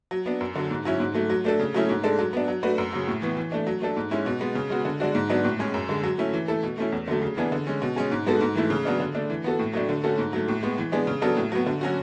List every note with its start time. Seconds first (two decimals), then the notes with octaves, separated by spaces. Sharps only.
0.11 F#3
0.26 B3 D4
0.41 F#2
0.55 D3 F#3
0.71 G#2
0.85 F#3 C#4 E4
1.00 G#2
1.14 F#3 A3
1.30 F#3
1.45 A3 D4 A4
1.59 C#3
1.74 F#3 A3 C#4 E4
1.89 G#2
2.04 G#3 D4 A4
2.19 F#3
2.33 B3 D4
2.48 F#3
2.63 A3 D4 F#4 B4
2.78 F#2
2.93 C#3 F#3
3.07 A2
3.22 E3 B3
3.37 E3
3.52 A3 D4
3.67 F#3
3.82 A3 D4 A4
3.96 G#2
4.11 G#3 C#4 E4
4.26 B2
4.41 G#3 B3
4.55 C#3
4.70 G#3 B3 F#4
4.85 D3
5.00 G#3 D4 F#4
5.15 G#2
5.30 F#3 B3 D4
5.45 A2
5.59 G#3 C#4 G#4
5.74 F#2
5.89 D3 G#3
6.04 F#3
6.18 A3 C#4 E4
6.33 E3
6.48 A3 E4 A4
6.63 B2
6.78 A3 C#4 E4
6.92 E2
7.08 D3 F#3 A3
7.22 C#3
7.37 E3 B3 D4 G#4
7.52 D3
7.67 G#3 C#4
7.82 B2
7.96 G#3 C#4 G#4
8.11 G#2
8.26 G#3 B3 F#4 A4
8.41 G#2
8.55 E3 A3 E4
8.70 C#3
8.85 F#3 B3 D4
9.00 D3
9.15 A3 D4
9.30 E3
9.44 B3 F#4 A4
9.59 A2
9.73 F#3 A3 D4
9.89 D3
10.04 A3 C#4 F#4 A4
10.18 G#2
10.33 F#3 A3
10.48 A2
10.63 G#3 B3
10.78 E3
10.92 G#3 B3 D4 G#4
11.07 C#3
11.22 F#3 B3 D4 A4
11.37 A2
11.52 F#3 B3
11.66 D3
11.81 F#3 C#4 F#4